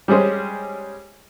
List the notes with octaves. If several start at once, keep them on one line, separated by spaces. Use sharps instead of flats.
G3 G#3 C#4 G#4 C5